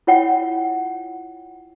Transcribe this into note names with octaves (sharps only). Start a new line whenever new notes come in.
E4 F4 C#5 F#5 G5